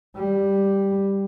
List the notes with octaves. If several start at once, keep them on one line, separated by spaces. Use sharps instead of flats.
G3